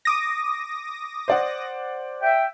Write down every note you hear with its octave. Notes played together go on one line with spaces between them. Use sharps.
D6 D#6 A#6
C5 D5 F#5
E5 G5